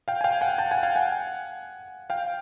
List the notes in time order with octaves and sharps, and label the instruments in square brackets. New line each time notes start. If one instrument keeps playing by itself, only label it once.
[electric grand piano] F5 G5
G#5
F5 G5
F#5 G#5
G5 A5
F#5 G#5
F5 G5
F#5 G#5
F5 G5